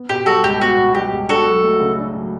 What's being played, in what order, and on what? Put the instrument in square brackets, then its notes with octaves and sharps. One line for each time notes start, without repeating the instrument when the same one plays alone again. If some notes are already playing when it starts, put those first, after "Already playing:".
Already playing: [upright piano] B3
[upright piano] B2 [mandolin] G4
[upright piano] G3 [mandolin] F#4 A4
[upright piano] C#2 [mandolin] G4
[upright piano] B3 [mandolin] F#4
[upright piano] B2
[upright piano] G3 [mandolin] G4
[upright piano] C#2
[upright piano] D4 [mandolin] F#4 A4
[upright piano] F#3
A3
C#3
D4
F#3